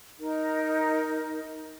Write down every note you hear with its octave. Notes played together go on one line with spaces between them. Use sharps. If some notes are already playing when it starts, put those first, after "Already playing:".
D#4 A#4